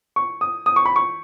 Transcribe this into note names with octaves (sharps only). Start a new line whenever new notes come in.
C#6
D#6
D#6
C#6
B5
C#6